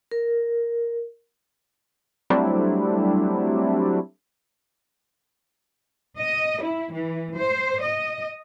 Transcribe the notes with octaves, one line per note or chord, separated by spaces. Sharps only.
A#4
F#3 G3 A3 C4 D4 E4
D#5
E4
E3
C5
D#5